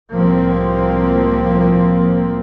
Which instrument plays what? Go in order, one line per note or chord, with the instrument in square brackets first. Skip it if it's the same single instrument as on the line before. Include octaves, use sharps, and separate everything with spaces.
[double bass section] C2 A2 F3 A#3 C4